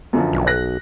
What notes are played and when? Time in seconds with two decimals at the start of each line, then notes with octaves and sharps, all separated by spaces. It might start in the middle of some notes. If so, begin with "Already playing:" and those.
0.13 F#2 D3 F3
0.33 B1
0.47 F#6 A#6